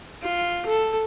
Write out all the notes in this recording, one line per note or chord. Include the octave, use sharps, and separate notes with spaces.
F4
A4